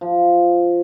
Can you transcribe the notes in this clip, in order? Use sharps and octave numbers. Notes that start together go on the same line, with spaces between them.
F3